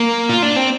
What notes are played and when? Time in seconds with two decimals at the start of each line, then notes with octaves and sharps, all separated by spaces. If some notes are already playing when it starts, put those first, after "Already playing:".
Already playing: A#3
0.29 F4
0.43 D4
0.56 C4